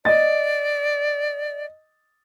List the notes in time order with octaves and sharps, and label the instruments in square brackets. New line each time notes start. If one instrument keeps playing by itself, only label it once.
[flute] D5 [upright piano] D#5 A6